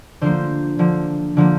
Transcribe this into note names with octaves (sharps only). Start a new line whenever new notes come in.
D3 F3 A#3 C5
D3 F3 A#3
D3 F3 A#3